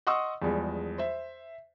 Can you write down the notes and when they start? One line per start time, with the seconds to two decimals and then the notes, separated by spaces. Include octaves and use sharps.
0.07 D#5 F#5 C6 C#6 D#6 E6
0.42 E2 F3 G3 G#3
0.98 C5 E5